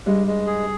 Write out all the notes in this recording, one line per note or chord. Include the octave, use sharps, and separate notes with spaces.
G2 G#3
G#3
G#4